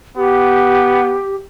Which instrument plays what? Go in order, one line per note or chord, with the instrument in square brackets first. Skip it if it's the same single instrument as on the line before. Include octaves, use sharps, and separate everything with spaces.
[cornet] B3 [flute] G4